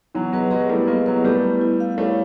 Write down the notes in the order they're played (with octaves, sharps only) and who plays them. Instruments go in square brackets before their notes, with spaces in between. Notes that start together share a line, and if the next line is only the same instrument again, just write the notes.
[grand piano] E3 F#3 [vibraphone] B3
[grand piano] F#3 G#3 [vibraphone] B4
[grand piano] F#3 G#3 [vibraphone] G4
[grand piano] G3 A3 [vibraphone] E4
[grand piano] G#3 A#3 [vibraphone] B3
[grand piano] F#3 G#3 [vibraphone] B4
[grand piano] G3 A3 [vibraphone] G4
[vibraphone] E4
E4
F5
[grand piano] G3 A3 [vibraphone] C#5